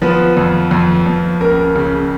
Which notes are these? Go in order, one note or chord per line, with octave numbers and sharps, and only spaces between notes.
F3 B3 B4
F2
F2
F2
C#2 A#3 A#4
C#3